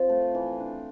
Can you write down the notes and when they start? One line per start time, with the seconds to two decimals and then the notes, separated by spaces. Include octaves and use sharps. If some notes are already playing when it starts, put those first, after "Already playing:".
Already playing: F3 C4 F4
0.09 A3
0.35 E3
0.60 D4